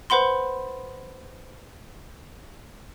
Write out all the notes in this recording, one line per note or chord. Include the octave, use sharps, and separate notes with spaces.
B4 C5 F#5 B5 C6